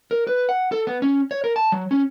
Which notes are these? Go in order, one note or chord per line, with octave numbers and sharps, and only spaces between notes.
A#4
B4
F#5
A4
B3
C#4
C#5
A#4
A5
F#3
C#4